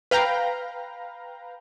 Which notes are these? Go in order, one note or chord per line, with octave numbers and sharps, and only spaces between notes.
B4 F5 G5 A#5